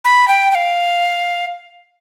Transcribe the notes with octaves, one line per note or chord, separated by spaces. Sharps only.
B5
G5
G5
F5